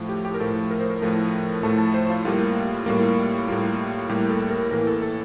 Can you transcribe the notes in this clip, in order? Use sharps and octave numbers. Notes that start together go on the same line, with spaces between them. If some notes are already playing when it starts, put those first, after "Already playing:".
Already playing: A2 F3 A3
G4
G4
A#4
A2 F3 A3 A4
A#4
C5
A#4
A2 F3 A3
A2 F3 A3 A5
A5
C5
F4
A2 G3 A#3 F4
A2 G3 A#3
A2 G3 A#3 F4
A2 G3 A#3 G4
A4
A#4
A2 E3 A#3 A#4
A4
A4